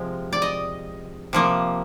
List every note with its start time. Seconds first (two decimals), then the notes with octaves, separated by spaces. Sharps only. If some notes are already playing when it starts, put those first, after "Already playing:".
Already playing: C3 F3 G#3
0.33 D5
0.42 D#5
1.33 C3 F3 A#3